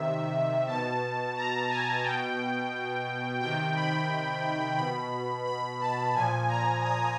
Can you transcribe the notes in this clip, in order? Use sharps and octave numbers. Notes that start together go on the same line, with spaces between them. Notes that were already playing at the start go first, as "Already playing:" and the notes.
Already playing: C3 D#3 E5
B2 A5
A#5
G#5
B2 G5
C3 D#3 G5
B5
B2 B5
B5
A5
A#2 F3 G#5
A#5
D#6